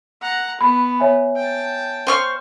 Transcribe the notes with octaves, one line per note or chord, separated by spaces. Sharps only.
F#5 A#5
B3 B5
C#5 E5 G#5
G5 A5
C5 C#6 F6